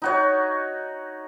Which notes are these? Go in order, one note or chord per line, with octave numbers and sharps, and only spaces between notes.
D#4 F#4 C#5